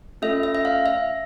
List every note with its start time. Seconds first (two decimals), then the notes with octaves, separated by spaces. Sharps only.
0.22 A3 C#4 F4 A4 E5
0.43 E5
0.55 E5
0.65 F5
0.86 E5